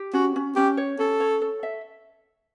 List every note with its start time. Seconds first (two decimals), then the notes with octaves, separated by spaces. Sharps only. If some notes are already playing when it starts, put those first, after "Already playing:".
Already playing: G4
0.13 C#4 F#4
0.36 C#4
0.56 C#4 G4
0.77 C#5
0.99 C#4 A4
1.20 C#5
1.41 A4
1.63 E5